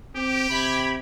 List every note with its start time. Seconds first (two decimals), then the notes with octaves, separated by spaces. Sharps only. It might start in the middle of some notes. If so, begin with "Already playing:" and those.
0.15 C4 G4
0.50 C3 B5 G#6